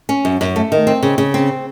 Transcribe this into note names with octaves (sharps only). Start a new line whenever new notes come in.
C#4
F#2
F#2
A3
D#3
C4
C#3
C#3
C4